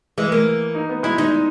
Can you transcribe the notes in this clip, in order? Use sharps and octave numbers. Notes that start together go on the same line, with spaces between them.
E3 G#3
A#3
D#4
B3
G#3 E4
G#3 D#4